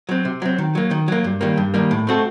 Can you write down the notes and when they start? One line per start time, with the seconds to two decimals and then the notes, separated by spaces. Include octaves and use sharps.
0.09 F#3 C4
0.25 C3
0.42 F#3 C4
0.58 D#3
0.75 F#3 A#3
0.91 D#3
1.08 F#3 A#3
1.24 G2
1.41 D#3 G3 A#3
1.57 G2
1.74 D#3 G3 A#3
1.91 A2
2.07 A3 C4 F#4 A4